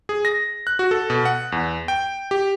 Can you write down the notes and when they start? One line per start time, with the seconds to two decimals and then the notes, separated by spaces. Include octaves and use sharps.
0.09 G#4
0.25 A#6
0.67 F#6
0.79 F#4
0.91 A4
1.10 B2
1.25 F#5
1.52 E2
1.88 G5
2.31 G4